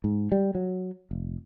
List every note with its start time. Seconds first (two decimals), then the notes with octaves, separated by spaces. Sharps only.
0.04 G#2
0.32 G3
0.55 F#3
1.11 F1